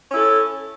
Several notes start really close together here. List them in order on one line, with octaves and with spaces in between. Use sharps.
C#4 E4 A4